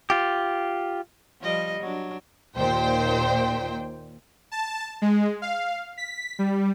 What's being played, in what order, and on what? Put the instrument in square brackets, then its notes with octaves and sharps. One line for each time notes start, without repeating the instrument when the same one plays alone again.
[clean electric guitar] F4 G4
[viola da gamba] F3 G3 D#5
F#3 D4
[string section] D#2 A#2 C5 G5
[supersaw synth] A5
G#3
F5
B6
G3